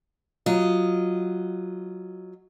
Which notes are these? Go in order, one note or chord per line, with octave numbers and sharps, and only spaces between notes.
F#3 F4 D#5